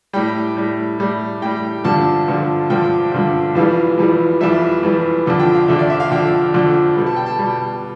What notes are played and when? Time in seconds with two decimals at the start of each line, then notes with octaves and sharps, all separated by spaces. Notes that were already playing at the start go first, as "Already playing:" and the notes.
0.13 A2 G3 G5
0.57 A2 G3
0.99 A2 G3
1.42 A2 G3 G5
1.84 G2 D3 F3 A5
2.28 G2 D3 F3
2.70 G2 D3 F3 G5
3.12 G2 D3 F3
3.55 F2 E3 G3 F5
3.98 F2 E3 G3
4.40 F2 E3 G3 E5
4.83 F2 E3 G3
5.26 F2 D3 F3
5.39 G5
5.55 F5
5.68 F2 D3 F3 E5
5.79 D5
5.90 E5
6.00 F5
6.11 F2 D3 F3 G5
6.54 F2 D3 F3
6.96 B2 G3
7.06 A5
7.16 G5
7.26 A5
7.39 B2 G3